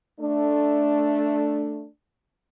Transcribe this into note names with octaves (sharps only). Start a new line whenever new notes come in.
A3 D4